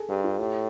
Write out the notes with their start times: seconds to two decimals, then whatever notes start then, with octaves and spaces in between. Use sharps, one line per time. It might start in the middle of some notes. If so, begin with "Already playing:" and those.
Already playing: G#4 A4
0.09 G2 G4
0.24 F4
0.39 A2 G4